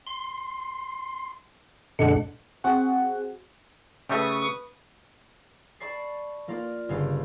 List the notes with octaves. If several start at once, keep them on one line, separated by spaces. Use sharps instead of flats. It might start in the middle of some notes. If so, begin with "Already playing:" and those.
C6
F#2 B2 D3 G#3 D4 F#5
C4 F#4 G#4 F#5
C#3 A3 G4 A4 B4 E5 C#6 D#6
D5 A5 B5 C#6 A6 C7
A#3 F4 A#4 D5
G1 C#3 F4